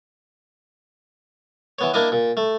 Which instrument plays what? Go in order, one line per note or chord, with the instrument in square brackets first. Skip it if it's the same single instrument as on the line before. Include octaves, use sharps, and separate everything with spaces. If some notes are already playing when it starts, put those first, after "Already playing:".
[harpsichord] E3 B3 C#5
A#3 D4 E4 D#5
A#2
A3